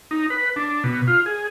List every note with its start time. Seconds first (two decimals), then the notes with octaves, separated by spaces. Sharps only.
0.11 D#4
0.30 B4
0.56 D4
0.84 B2
1.07 F4
1.26 G#4